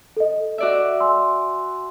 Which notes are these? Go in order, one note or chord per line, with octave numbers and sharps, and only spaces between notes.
A4 D#5
F#4 D5 E5
G#5 C6 E6